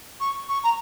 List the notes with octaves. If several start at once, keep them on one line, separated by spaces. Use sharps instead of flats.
C#6
C#6
A#5